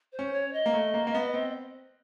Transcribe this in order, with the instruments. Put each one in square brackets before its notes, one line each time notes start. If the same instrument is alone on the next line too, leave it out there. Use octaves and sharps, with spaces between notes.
[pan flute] C5
[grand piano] C#4
[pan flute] C#5
D#5
[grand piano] A#3
A3
A#3
A#3
B3
C4